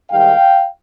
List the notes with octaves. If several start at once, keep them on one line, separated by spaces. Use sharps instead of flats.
G#2 D#3 G3 F5 G5